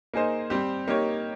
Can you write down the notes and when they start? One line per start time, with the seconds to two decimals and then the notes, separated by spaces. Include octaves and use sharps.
0.14 A#3 D#4 G#4 C5 D#5
0.50 G3 C4 G4
0.88 A#3 D#4 G4 C#5